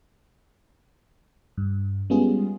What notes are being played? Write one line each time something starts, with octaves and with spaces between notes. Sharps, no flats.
G2
G3 G#3 B3 C#4 F4 G#4